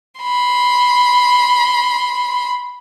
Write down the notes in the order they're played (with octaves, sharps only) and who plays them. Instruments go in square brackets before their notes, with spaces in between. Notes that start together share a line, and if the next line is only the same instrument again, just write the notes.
[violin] B5 C6